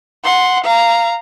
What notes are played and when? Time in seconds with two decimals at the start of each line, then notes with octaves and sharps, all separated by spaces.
0.24 F#5 C6
0.64 F5 A#5